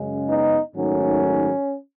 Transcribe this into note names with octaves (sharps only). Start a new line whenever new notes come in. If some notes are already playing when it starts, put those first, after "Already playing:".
Already playing: F#2 C#3 G#3
B3 D#4
G#2 D#3 F#3 A3 C#4